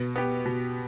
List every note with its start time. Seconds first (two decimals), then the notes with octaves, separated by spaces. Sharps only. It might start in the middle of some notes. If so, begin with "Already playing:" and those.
Already playing: B2
0.16 B3 G4
0.45 B2